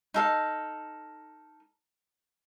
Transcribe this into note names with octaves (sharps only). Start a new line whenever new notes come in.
D#4 A4 F5